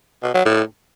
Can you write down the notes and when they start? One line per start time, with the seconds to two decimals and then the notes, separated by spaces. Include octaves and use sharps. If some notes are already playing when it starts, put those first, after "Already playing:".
0.23 B2
0.34 F#3
0.45 A2